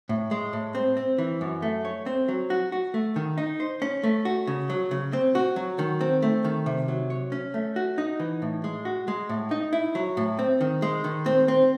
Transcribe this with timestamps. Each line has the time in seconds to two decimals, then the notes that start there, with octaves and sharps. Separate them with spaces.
0.09 A2
0.31 G#3
0.53 A2
0.75 C4
0.97 C4
1.18 E3
1.41 F#2
1.62 A3
1.85 C#5
2.06 C4
2.28 F#3
2.50 F#4
2.72 F#4
2.94 A3
3.16 D#3
3.38 D#4
3.60 C5
3.82 C#4
4.03 A3
4.25 F#4
4.47 C#3
4.70 F#3
4.91 C#3
5.13 C4
5.35 F#4
5.56 F#3
5.79 D#3
6.01 C4
6.22 A3
6.44 D#3
6.66 C3
6.88 F#3
7.10 C#5
7.32 C#4
7.54 A3
7.76 F#4
7.98 D#4
8.20 E3
8.42 A2
8.64 G#3
8.85 F#4
9.08 G#3
9.29 A2
9.51 D#4
9.73 E4
9.95 F#3
10.17 A2
10.39 C4
10.61 D#3
10.82 G#3
11.04 D#3
11.26 C4
11.48 C4